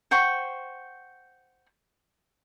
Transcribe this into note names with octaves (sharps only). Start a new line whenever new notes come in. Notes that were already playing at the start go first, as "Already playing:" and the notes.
C5 F#5 G5 C#6